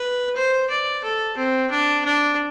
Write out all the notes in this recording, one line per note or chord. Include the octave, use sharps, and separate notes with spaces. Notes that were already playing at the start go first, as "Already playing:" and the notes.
Already playing: B4
C5
D5
A4
C4
D4
D4